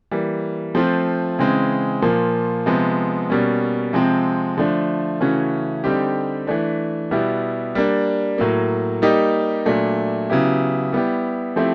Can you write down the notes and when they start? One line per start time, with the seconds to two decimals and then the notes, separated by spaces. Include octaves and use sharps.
0.11 E3 G3 A#3
0.75 F3 A3 C4 F4
1.39 C#3 E3 G#3 C4
2.02 A#2 F3 A#3
2.66 C3 F3 G#3 B3
3.30 B2 G3 A#3 C#4
3.93 C3 F3 G#3 C4
4.57 D3 F3 A3 D4
5.21 C#3 E3 A3 C#4 F#4
5.84 D3 G3 C4 D#4 G4
6.47 E3 A3 D4
7.11 B2 G3 B3 E4 G4
7.75 G3 A#3 D4
8.38 A2 F#3 A#3
9.02 G3 A#3 D#4 G4
9.66 A#2 F#3 A3 D4
10.30 C#3 F#3 B3 E4 G4
10.93 G3 B3 E4 G4
11.56 F3 A3 C4 E4 G4